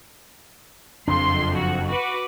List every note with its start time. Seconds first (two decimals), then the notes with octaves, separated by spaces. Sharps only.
1.08 F#1 F2 D4 C6
1.58 F#4
1.88 F#4 B4 D6